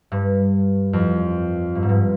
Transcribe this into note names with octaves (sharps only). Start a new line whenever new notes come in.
G2
F2
G2
G#2
G2